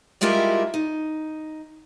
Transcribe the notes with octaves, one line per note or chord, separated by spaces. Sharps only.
G3 G#3 E4 F4 G4 A#4
D#4